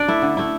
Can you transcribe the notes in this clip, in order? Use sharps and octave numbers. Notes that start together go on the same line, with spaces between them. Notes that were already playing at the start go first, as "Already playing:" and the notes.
Already playing: D4 D5
A3 E4
D3
A3 E4